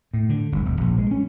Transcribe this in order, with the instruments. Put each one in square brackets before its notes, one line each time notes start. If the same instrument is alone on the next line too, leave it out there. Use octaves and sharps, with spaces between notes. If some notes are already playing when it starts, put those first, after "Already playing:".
[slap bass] A2
D3
G1
E1
A#1
G#3
C#4